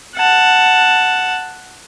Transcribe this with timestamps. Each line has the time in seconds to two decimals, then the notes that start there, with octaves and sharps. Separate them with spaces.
0.15 F#5 A5